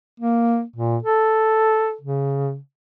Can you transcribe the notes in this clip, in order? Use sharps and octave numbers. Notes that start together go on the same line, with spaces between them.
A#3
A#2
A4
C#3